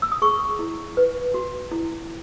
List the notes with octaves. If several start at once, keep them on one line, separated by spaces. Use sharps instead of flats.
E6
D#6
G#4 C#6
E4
B4
F#4
E4